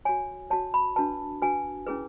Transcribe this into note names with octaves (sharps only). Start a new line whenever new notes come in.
F#4 C#5 G#5
F#4 C#5 A5
B5
D4 F#4 B4 A5
D4 F#4 B4 G#5
C#4 E4 G#4 B4